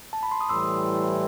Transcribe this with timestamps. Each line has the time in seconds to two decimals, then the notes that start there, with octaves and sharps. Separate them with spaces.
0.13 A5
0.23 B5
0.32 C6
0.41 D#6
0.49 A2 E3 G3 C6 E6